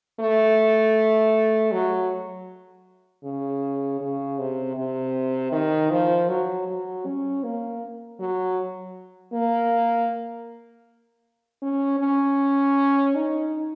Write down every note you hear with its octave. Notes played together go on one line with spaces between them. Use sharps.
A3
F#3
C#3
C#3
C3
C3
D#3
F3
F#3
F#3
C#4
A#3
F#3
A#3
C#4
C#4
D#4